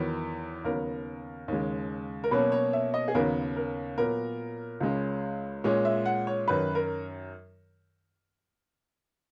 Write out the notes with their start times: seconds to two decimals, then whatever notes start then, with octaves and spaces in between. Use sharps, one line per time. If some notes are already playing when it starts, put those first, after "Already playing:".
Already playing: E2 D#3 F#3 B3
0.64 D#2 C#3 F#3 B3 A#4
1.48 D#2 C#3 G#3
2.24 A#4
2.31 B2 F#3 A#3 C#4 B4
2.52 C#5
2.73 E5
2.94 D#5
3.08 G#4
3.15 D#2 C#3 F#3 B3 A#4
3.56 A#4
3.97 A#2 F#3 B3 A#4
4.80 C#2 C#3 G#3 C#4
5.64 A#2 G#3 C#4 C#5
5.85 E5
6.06 F#5
6.27 C#5
6.48 F#2 D#3 F#3 B4
6.75 A#4